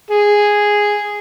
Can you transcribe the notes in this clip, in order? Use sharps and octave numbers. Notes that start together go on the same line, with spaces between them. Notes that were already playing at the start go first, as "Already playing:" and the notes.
G#4